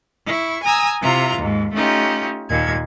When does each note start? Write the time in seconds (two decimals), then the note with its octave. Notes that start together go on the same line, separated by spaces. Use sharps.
0.26 E4 C#6
0.64 G#5 A#5 D#6 E6
1.01 C3 E4 F4 A#5
1.38 D#2 G#2
1.74 A3 C#4 D#4 F4 G4
2.49 D#2 A#2 G#6